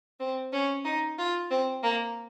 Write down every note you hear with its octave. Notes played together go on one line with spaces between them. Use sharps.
C4
C#4
D#4
F4
C4
A#3